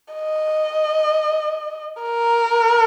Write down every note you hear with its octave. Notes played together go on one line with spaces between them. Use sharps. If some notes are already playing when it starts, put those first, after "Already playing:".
D#5
A#4